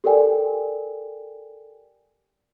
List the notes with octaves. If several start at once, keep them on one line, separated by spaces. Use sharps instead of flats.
G4 A4 A#4 D5 G5 G#5